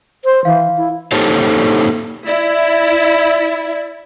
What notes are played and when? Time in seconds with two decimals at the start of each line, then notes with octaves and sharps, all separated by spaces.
0.24 C5
0.45 E3 F5
0.77 E4
1.12 A#3 D#4 G4 A4 C5 C#5
2.27 E4 D5